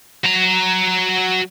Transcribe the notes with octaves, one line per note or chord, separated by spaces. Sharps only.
F#3 A#5